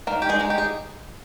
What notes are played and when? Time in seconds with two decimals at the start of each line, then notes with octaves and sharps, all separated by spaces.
0.07 D#3 A#3 A#4
0.22 G4
0.29 G#3 G#4
0.40 G#3 D#4
0.50 G4
0.58 G#4